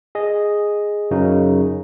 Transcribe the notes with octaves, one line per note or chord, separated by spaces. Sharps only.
G#4 D#5
F#2 C#3 F#3 D#4